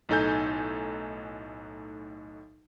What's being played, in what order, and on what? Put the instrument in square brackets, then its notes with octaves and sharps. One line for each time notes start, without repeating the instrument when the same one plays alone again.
[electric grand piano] B1 A2 D#4 A4 G#5 G6